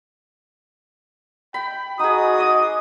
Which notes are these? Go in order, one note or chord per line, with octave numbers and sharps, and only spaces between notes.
G5 B5
D#4 F#4 G#4 D#6
D#5 D6